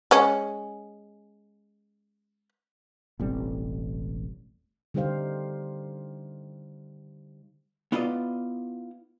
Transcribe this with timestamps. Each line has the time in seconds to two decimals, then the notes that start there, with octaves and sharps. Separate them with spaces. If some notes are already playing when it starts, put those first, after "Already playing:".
0.11 G#3 C#4
3.19 E1 A1 G3 C4
4.94 D3 G3 D#4 G4 C5 F5
7.92 B3 E4 F4 D5 D#5